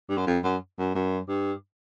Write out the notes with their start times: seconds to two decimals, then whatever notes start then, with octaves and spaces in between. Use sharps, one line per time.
0.09 G2
0.18 F#2
0.27 F2
0.44 F#2
0.78 F#2
0.95 F#2
1.29 G2